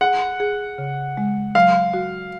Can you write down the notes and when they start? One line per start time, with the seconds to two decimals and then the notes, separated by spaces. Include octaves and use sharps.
0.01 G#4 F#5
0.40 G#4
0.78 C#3
1.17 G#3
1.55 F#3 F5
1.94 F#4